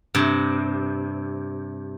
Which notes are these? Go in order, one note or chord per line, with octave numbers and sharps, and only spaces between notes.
G2 C3